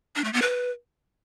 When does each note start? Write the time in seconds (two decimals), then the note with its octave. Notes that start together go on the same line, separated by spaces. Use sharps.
0.16 D4
0.24 A3
0.33 B3
0.42 B4